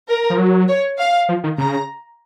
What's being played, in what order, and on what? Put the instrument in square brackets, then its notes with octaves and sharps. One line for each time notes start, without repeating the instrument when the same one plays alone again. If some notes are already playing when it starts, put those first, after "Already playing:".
[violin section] A#4
[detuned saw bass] F3
F#3
[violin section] C#5
F5
[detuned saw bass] F3
D#3
[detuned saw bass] C#3 [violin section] A#5